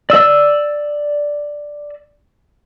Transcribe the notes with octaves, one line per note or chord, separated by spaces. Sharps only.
D5 E6